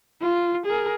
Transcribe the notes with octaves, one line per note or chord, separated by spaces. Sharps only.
F4
G#4 A#4